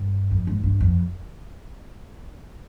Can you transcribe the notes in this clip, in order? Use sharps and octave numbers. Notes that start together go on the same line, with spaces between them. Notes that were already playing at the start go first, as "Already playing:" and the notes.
Already playing: G2
F2
G#2
G2
F2